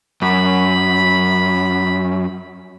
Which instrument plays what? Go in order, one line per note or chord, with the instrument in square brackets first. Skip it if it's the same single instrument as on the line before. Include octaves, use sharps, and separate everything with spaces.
[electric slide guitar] F#2 [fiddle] B5